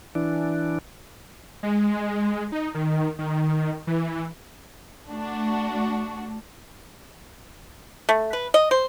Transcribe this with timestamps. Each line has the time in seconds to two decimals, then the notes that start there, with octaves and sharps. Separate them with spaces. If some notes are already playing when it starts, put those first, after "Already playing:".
0.15 E3 D4
1.63 G#3
2.52 D#4
2.75 D#3
3.19 D#3
3.87 E3
5.11 A3 D4 F#4
8.09 A3
8.33 B4
8.54 D#5
8.71 C5